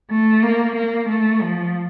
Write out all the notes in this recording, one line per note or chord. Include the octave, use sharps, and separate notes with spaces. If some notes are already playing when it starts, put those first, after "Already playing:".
A3
A#3
A#3
A3
F3